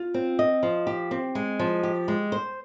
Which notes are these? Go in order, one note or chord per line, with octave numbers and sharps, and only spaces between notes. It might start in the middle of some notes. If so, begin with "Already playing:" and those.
Already playing: F4
C4
D#5
F3
G4
C4
G#3
F3
G4
G#3
C5